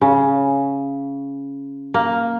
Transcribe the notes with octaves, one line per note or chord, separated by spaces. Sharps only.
C#3
A#3